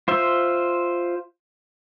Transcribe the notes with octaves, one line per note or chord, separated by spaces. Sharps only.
F4 C5 E5